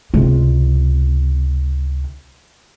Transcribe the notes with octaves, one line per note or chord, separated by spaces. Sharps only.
C#2 C3